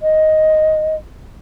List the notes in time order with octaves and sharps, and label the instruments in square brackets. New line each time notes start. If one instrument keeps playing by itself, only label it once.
[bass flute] D#5